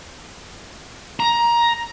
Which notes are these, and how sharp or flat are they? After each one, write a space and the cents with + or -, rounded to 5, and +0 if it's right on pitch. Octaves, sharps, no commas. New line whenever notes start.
A#5 +15